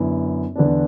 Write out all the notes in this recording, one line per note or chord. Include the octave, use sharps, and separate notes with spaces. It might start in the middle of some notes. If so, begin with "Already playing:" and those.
Already playing: F#2 D3 B3 E4
E2 D3 B3 D4